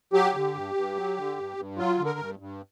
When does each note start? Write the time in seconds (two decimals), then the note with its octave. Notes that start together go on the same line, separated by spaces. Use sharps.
0.13 F#3 G4
0.35 D3
0.54 G2
0.75 G2
0.95 F#3
1.17 D3
1.37 G2
1.57 G2
1.78 F#3 F4
1.98 D3
2.06 A#4
2.19 G2
2.39 G2